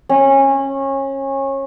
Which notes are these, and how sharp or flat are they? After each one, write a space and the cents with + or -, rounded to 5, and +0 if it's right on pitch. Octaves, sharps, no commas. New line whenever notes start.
C#4 -25